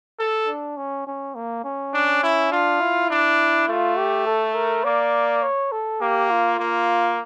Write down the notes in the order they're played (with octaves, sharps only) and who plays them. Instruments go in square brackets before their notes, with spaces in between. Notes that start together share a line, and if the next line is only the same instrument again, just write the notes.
[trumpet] A4
[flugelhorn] D4
C#4
C#4
A#3
C#4
[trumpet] D4
E4
[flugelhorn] D4 [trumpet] F4
[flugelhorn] E4
[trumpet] D4
[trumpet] A3 [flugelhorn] F4
[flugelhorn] G4
A4
A#4
[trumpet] A#3 [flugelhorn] D5
[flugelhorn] C#5
A4
[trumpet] A#3 [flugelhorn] G4
[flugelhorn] F4
[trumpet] A#3